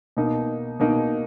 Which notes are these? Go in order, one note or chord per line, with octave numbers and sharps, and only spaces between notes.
B2 A#3 D#4
B2 A#3 D#4